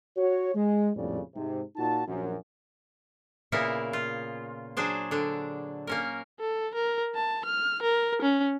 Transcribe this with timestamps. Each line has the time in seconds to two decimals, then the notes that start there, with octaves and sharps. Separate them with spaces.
0.17 F#4 C#5
0.55 G#3
0.95 A#1 F2 A2 C#3 G3 D5
1.35 G#2 C3
1.76 A#2 D#4 F4 F#4 A5
2.07 A#1 F#2
3.52 A#2 C#3 A#3 B3 E4 A#4
3.93 F4
4.77 F#3 D4 G#4 C5
5.11 D3 D4
5.87 A#3 C#4 A#4
6.40 A4
6.75 A#4
7.15 A5
7.45 F6
7.83 A#4
8.22 C#4